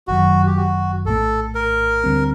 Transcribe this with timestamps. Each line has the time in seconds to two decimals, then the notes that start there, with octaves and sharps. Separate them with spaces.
0.07 G1 F#2 D#3 F#3 F#4
0.46 G4
0.57 F#4
1.05 A#1 A2 A3 A4
1.55 A#4
2.04 D2 D3 G3 C4